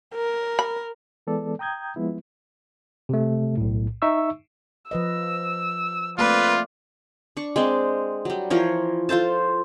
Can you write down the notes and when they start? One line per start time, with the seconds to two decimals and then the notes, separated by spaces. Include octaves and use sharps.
0.15 A#4
0.59 B5
1.27 E3 G#3 B3 A4 D5
1.59 G5 A#5 D#6 G6 G#6
1.96 F3 G#3 B3 E4
3.09 C3 A3
3.57 B1 A2
4.02 D#4 E5 C#6 E6
4.91 F3 B4 D#5 E6
6.18 A3 A#3 C4 F4 B4 D5
7.37 D4 C#6
7.56 G#3 C4 D5
8.25 F#3 G3
8.50 E3 F3 A#4 C#5
9.09 F4 A4 C5 A5